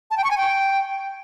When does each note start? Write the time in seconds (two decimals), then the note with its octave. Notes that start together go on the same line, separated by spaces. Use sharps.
0.11 A5
0.17 G5
0.24 C#6
0.31 G#5
0.37 G5